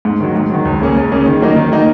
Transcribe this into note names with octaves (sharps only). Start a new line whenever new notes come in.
G#2
D#3 F#3
G#2
D#3 F#3
C#2
C#3 A#3 C#4 G#4
C#2
C#3 A#3 C#4 G#4
D#3
F#3 A#3 D#4
D#3
F#3 A#3 D#4